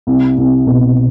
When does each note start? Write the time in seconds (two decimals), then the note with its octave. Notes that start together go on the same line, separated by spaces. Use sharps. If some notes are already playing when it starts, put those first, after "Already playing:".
0.07 C2
0.38 C2
0.67 B2